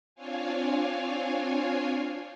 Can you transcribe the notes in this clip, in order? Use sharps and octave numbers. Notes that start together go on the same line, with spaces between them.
C4 D4 F4 C#5 F5 G#5